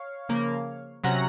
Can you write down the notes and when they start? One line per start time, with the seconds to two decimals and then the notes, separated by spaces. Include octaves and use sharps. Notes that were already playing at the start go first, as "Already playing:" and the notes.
Already playing: C#5 F5
0.29 C#3 F3 A#3
1.04 C3 F#3 C#4 F#5 A#5